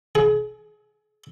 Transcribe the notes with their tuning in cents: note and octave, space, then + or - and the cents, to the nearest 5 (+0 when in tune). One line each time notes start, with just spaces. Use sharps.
G#4 +35